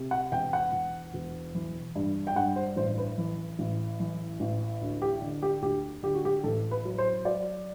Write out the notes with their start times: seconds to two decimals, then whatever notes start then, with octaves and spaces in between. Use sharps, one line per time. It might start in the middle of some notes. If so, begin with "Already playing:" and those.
Already playing: C3
0.11 F#5
0.32 E1 G5
0.53 F#5
0.72 E1
1.14 E1
1.55 E3
1.96 G2
2.27 G5
2.36 G2 F#5
2.56 C5
2.76 A1 C5
2.98 B4
3.18 E3
3.59 A1
4.00 E3
4.40 A1
4.81 D2
5.02 G4
5.22 D3
5.42 G4
5.62 D2 G4
6.03 D3 G4
6.14 F#4
6.25 G4
6.44 A1 A4
6.71 B4
6.85 F#3
6.98 C5
7.25 F#3 D5